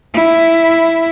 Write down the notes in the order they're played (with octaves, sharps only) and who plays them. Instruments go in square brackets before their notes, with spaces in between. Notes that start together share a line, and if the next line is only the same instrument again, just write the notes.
[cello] E4